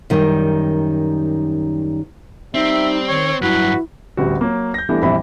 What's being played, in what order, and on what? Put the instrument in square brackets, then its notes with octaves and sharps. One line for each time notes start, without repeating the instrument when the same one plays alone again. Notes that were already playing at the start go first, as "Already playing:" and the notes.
[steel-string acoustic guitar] F#2 D#3 G3
[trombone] G3 [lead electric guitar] C4 [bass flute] D#4 [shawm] E5
[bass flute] D#3 [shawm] C#5
[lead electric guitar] G2 F#3 [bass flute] E4 [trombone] F#4 [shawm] B4
[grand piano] A1 D2 G3 F#4
F#3 A#3
G6 A#6
E3 G3 A3 B3 D4 E4
A#1 F2 E3 G3 E4 B5